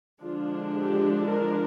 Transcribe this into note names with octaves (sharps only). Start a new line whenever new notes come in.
D3 F3 G#3 D4 F4
G4
A#4